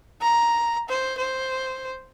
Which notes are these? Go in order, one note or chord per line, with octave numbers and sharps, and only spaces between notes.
A#5
C5
C5